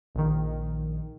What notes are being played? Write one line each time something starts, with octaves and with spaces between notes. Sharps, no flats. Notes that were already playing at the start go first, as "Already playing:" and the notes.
A#1 D#3